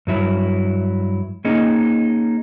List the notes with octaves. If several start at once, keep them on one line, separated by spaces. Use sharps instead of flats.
G2 F#3 E4
A#3 C#4 D#4 G#4